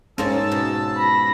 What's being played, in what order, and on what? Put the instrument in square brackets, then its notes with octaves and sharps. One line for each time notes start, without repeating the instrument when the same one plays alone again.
[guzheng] G#2 A#3 C#5 [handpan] C#4 [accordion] A5 E6
[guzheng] B2
[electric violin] B5 A#6